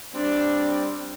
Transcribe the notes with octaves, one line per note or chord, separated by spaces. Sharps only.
G3 C4 D4 D5